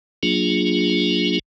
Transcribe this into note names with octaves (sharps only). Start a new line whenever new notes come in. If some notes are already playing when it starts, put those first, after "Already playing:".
F#3 A#3 D4 F4 G#4